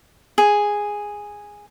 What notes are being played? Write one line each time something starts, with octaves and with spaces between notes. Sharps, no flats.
G#4